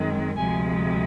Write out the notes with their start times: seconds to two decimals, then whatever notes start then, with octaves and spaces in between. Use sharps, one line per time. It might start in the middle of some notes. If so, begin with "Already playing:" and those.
Already playing: F#2 D#3 G#3 C4
0.37 D2 C3 F3 G#3 G#5